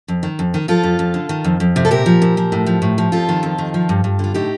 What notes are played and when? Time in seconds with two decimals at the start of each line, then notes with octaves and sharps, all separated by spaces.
0.08 F2
0.23 D#3
0.39 F2
0.54 D#3
0.68 F3 F4 A4
0.83 F2
0.99 F2
1.14 D3
1.29 D#3
1.44 F2
1.60 F2
1.76 C3
1.85 A4
1.91 A#2 G4 A#4
2.06 F3
2.22 A#2
2.37 F3
2.52 A2
2.66 F3
2.82 A2
2.98 F3
3.12 F2 F4 A4
3.29 D#3
3.43 F2
3.58 D#3
3.74 F3
3.89 G2
4.04 G2
4.19 D3 F4
4.34 A2 D#4 G4